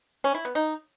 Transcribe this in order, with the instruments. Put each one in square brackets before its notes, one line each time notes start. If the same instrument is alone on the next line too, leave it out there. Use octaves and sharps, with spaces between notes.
[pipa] C#4
E4
B3
D#4